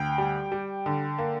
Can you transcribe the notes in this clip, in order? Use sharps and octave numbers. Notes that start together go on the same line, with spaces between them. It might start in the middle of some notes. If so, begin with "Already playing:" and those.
Already playing: D2 G5
G3
G3
D3
A#3